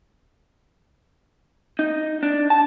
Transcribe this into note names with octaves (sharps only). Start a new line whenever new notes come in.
D#4
D4
A5